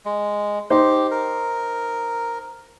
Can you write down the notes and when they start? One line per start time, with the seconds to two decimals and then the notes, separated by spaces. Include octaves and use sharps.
0.05 G#3
0.70 D#4 G4 C5
1.11 A#4